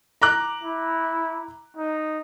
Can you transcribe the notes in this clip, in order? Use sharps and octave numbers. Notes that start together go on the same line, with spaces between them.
A#5 D6 F#6
E4
D#4